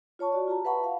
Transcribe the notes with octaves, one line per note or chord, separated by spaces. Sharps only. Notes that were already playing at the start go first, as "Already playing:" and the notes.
F4 C#5 A5 C#6
F#4 D5
F4 G4 A5 A#5
B4 E5 F#5 A5 B5 C#6
F5